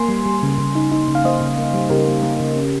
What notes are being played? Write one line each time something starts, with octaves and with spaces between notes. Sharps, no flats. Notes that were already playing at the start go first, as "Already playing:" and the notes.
Already playing: A#3 G#5 C6
G3
G3
C#3
C#3
D#4
D#4
C#3
F5
A#3 C5 D#5
C#3
A#3
G3
C#3 G4 A#4
A#3
A#3
C#3
C#4